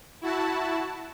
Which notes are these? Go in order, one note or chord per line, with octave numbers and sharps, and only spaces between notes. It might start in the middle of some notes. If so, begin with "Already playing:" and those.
E4 F#4 A5